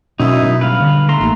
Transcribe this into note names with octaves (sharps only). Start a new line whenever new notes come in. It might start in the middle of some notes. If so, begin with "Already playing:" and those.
F#2 B2 C#4 D#4 E4 D#5
B2 F#3 B3
G1 B4 F5
D3
A3 A#5 C6
A1 D#2